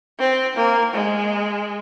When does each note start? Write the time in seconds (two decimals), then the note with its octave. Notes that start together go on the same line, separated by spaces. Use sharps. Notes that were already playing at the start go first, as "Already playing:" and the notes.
0.20 C4
0.57 A#3
0.94 G#3